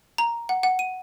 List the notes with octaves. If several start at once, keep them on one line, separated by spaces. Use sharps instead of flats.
A#5
F#5
F#5
D#7